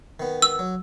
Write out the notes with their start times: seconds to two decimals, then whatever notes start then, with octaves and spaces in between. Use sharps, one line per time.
0.20 D#3 B3
0.42 E6
0.59 F#3